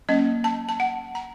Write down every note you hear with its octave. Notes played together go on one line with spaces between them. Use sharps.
F#3 A#3 C#4 D#5
A5
A5
F#5
A#5